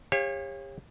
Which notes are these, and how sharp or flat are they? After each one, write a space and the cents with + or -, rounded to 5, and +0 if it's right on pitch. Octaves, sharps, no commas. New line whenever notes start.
G4 +40 C#5 -30 F5 +0